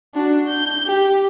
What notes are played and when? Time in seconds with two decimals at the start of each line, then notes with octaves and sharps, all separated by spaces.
0.15 D4 F#4
0.47 G6
0.87 G4